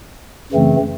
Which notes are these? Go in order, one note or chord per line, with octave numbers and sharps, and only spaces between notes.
F#2 C#3 E3 A3 C4